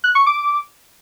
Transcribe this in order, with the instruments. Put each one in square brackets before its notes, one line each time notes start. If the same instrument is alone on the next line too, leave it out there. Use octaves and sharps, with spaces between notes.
[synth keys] F#6
C#6
D6